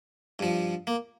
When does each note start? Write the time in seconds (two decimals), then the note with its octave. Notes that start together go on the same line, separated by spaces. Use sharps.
0.39 G2 F3
0.87 A#3